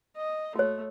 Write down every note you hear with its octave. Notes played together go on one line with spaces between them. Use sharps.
D#5
A3 F#4 C#5